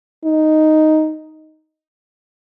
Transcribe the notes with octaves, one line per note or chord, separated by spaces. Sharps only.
D#4